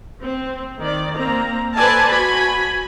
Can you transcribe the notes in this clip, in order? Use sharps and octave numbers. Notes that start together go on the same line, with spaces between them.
C4
D#3 D5
A#3 C4 A#5
A4 B4 C5 D5 G#5 A5
F#4 G#5 B5